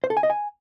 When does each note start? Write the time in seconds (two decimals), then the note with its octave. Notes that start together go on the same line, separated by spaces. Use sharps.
0.04 C5
0.10 A4
0.17 G#5
0.23 D#5
0.30 G#5